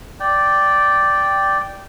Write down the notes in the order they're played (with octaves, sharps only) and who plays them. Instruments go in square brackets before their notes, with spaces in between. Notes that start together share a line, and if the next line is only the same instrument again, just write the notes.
[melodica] D5 G5